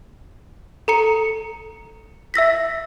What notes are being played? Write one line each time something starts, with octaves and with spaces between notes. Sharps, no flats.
A4 A#5 C#7
E5 E6 A#6 B6